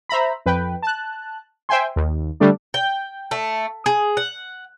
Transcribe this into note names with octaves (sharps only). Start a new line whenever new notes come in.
C5 E5 A#5 B5
F2 B4 G5
A5 F#6
C5 E5 G5 G#5 C6
D#2
D3 G3 A3 D4
G5
A3
G#4
F#5